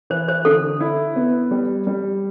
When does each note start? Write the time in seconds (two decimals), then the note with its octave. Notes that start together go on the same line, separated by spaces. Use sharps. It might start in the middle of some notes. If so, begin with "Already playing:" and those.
0.10 E3 C5
0.28 C5
0.45 D3 A4
0.80 E4
1.16 B3
1.51 G3
1.87 G3